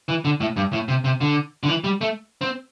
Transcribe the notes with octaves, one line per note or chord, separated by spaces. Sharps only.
E3
D3
A2
G2
A2
C3
C3
D3
D3
E3
G3
A3
C4